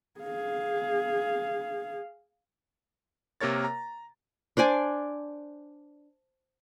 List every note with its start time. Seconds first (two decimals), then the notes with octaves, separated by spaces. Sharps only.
0.21 G#4 F5
3.41 C3 A#3 A#4 C#5 A6
3.64 A#5
4.57 D4 C5 D5 G#5